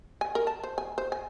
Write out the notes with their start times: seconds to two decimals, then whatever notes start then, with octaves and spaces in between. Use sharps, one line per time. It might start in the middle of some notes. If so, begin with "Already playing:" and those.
0.21 G#5
0.35 A#4
0.47 A5
0.63 C5
0.78 G#5
0.98 C5
1.12 G#5